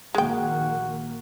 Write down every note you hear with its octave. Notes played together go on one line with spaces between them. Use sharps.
A#1 D#3 G#3 A#3 F#4 G5